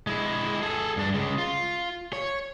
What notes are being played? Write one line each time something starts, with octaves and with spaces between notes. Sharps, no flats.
G#3 E4
G#4 A4
G2 D4
C#3 G#3
F4
C#5